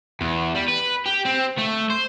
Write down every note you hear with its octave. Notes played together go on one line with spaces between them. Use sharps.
E2
G3
B4
G4
C4
A3
C5